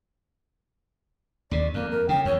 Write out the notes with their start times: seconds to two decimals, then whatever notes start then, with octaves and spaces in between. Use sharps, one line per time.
1.51 D#2 C3 D5
1.74 F2 A#3
1.91 A#4
2.09 C#3 G5
2.25 E2 C#5